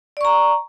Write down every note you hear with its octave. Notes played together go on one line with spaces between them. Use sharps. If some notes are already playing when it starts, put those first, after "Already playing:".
D5 A#5 C#6